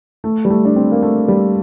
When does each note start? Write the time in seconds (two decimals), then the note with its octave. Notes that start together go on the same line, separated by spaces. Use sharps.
0.24 A3
0.45 G3
0.50 A3
0.65 D4
0.76 C4
0.91 A#3
1.03 A3
1.28 G3